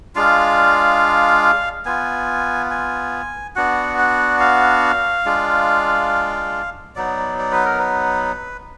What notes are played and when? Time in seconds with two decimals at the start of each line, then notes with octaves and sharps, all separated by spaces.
0.15 G#3 D4 F4 F5
1.85 B3 F4 G#5
2.71 G#5
3.56 B3 D4 F#4 F#5
3.98 F#5
4.40 F5
5.25 G#3 D4 F4
6.96 F#3 B3 D#4 D5
7.39 D5
7.52 B4
7.65 A#4
7.79 B4